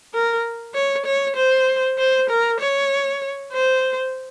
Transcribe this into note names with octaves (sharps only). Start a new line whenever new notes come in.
A#4
C#5
C#5
C5
C5
A#4
C#5
C5